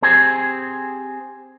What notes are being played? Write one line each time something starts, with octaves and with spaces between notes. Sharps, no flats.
C4 G4 G#4